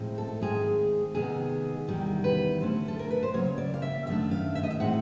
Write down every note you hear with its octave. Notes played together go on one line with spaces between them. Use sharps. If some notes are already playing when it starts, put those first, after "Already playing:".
Already playing: A2 F3 G#3 C4 D#4
A4
G#2 D#3 G#3 C4 G#4
C3 D#3 G#3 B3 G#4
E2 C3 D#3 G3
B4
D3 F#3 A3 C#4 C5
A4
A#4
B4
C5
C#3 F#3 A#3 C#5
D5
F5
E5
F#2 D#3 F#3 A3 D4 E5
F5
E5
D#5
E5
A2 E3 G#3 C4 D#4 F#5